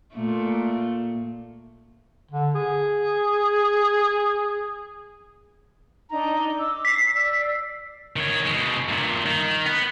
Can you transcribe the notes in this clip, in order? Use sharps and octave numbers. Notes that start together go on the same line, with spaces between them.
A#2 A3
D3
G#4
D4 D#4 A#5
D6 E6
B6 C7
D5 E6
D#3 C#5
B2 G#3
G2 A#2
D#3
B3